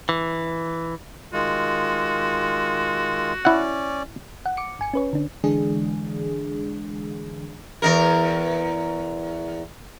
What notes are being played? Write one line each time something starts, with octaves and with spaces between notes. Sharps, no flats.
E3
D#3 G#3 F4 F#4
C#4 E4 D5 F#5
F#5
D6 C#7
G1 G#5 C#7
C#4 B4 C#5
D3 D4
D3 E3 G#3 D4 G#4
E2 G2 A#4